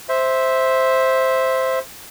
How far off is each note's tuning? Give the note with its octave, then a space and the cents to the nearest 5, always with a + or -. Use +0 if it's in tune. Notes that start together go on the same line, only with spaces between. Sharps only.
C5 +0 E5 -10